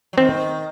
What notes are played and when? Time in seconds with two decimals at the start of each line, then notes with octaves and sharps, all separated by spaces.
0.13 F#3
0.17 D#3 C4